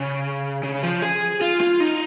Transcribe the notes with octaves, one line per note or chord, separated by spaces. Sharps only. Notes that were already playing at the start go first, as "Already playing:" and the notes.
Already playing: C#3
C#3
F3
G#4
F4
F4
D#4